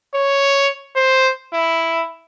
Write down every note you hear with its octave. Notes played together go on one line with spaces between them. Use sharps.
C#5
C5
E4